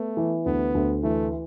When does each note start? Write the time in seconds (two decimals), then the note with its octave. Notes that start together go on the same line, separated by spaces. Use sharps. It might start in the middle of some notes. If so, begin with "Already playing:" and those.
Already playing: A3 B3
0.17 E3
0.46 D2 B3
0.75 D2
1.03 E3 A3